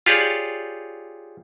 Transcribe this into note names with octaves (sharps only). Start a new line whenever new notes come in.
F4 G4 G#4 C#5 D5